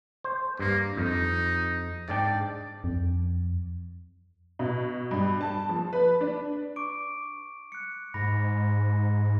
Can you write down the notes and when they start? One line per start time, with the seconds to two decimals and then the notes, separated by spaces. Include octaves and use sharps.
0.24 C5
0.59 G2 A#3
0.97 F2 D#4
2.09 G#2 D4 D5 G5
2.84 F2
4.59 B2
5.11 G2
5.41 A5
5.69 F3
5.93 B4
6.21 D4
6.76 C#6 D6 D7
7.72 F#6 C#7
8.14 G#2 B5 A#6